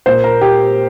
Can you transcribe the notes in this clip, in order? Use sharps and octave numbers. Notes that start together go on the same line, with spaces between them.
A#2 A#3 C5
A#4
G4